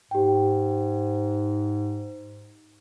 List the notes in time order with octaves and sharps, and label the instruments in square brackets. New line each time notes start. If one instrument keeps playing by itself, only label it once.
[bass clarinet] G#2 [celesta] G4 G5